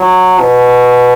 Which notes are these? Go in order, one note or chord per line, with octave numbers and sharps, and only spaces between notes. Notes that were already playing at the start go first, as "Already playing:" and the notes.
Already playing: F#3
B2